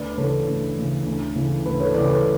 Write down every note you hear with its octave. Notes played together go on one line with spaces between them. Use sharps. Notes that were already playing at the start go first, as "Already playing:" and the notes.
Already playing: D2 B4 D5
C#3 E3 A4 C#5
D2
C#3 E3
D2
C#3 E3
D2 B4
A4 C#5
C#3 E3 B4 D5
A4 C#5